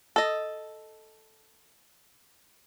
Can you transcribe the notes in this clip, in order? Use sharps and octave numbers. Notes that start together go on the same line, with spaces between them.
A4 D#5